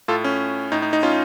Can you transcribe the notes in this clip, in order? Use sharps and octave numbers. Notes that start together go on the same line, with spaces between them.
A2 F4 A4
C#4
A2 D#4
D#4
D#4
C#4 F4